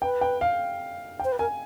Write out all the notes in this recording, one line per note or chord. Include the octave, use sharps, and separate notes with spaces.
B4 G5
G5
F5
G5
C5
B4
A#4 G#5